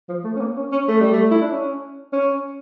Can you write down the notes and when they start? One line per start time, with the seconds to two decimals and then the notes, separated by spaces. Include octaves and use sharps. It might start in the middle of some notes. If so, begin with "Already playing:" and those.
0.09 F3
0.24 A3
0.36 C#4
0.41 A#3
0.57 C#4
0.72 C#4
0.88 A3
1.01 G3
1.13 A3
1.31 E4
1.41 D4
1.51 C#4
2.13 C#4